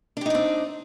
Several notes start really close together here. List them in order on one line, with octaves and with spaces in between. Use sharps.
D4 G4 D#4 D5 C4